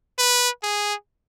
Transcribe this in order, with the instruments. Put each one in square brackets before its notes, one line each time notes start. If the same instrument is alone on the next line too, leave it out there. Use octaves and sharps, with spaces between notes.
[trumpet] B4
G#4